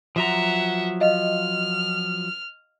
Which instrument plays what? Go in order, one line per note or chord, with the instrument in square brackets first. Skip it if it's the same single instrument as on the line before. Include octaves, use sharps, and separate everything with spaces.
[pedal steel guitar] F3 F#3 A#5 [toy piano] F#4 [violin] E5 F#5
[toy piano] D#5 F5 [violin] F6